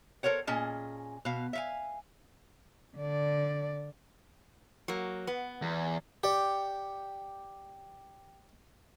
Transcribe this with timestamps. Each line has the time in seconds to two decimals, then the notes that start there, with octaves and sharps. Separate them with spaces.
0.23 A4 A#4 C5 C#5 F#5
0.47 A#2 C#4 G#4 D#5 A5
1.25 B2 F5
1.53 E5 F5 G#5
2.97 D3 D5
4.88 F#3 A#3
5.27 B3
5.62 E2
6.24 G4 D5 G5